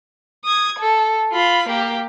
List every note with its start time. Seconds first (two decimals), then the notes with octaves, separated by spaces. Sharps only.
0.45 D#6 G#6
0.79 A4
1.33 F4 B5
1.69 A#3 G4